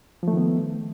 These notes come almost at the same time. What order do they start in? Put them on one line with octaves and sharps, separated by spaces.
F3 A3 D#3 B3